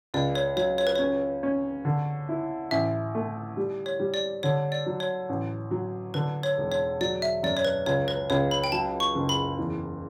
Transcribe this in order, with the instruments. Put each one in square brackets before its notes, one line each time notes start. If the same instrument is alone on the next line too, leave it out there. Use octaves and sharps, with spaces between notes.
[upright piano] C#2 [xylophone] D5
[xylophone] C#5
[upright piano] F#3 [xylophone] C#5
[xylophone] C#5
B4
[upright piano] C#4 [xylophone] C#5
[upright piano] C#4
D3
E4
[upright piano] A1 [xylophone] E5
[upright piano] A3
G3
[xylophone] C#5
[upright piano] G3
[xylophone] D5
[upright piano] D3 [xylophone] C#5
[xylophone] D5
[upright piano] F#3
[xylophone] C#5
[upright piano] A1
F#3
[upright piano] D3 [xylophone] B4
[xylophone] C#5
[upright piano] E1
[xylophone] C#5
[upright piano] F#3 [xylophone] D5
[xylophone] E5
[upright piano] F#2 [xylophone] D5
[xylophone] C#5
B4
[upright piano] C#2 [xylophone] C#5
[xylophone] B4
[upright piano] C#2 [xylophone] C#5
[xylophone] B5
G5
[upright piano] F#3 [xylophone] A5
[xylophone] C#6
[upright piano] F#1
[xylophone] B5
[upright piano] E2